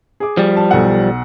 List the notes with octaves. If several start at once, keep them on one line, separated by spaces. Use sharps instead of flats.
G#4 D6
F3 G3
A5
B1 A4 F#5